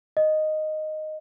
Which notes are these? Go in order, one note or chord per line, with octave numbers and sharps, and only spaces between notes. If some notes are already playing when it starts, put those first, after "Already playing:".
D#5